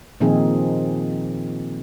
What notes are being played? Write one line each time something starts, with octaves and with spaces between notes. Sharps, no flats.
A#2 D#3 F3 C4 D#4 G#4